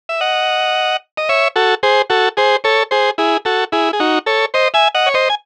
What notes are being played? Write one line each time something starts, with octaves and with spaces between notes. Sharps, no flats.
E5
D#5 F#5
D#5
C#5 E5
F#4 A4
G#4 C5
F#4 A4
G#4 C5
A4 C#5
G#4 C5
E4 G#4
F#4 A4
E4 G#4
G#4
D#4 F#4
A4 C#5
C5 D#5
E5 G#5
D#5 F#5
C#5
C5 D#5
G#5